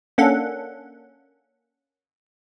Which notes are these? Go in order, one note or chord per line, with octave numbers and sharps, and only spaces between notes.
A#3 C#4 D4 A4 F#5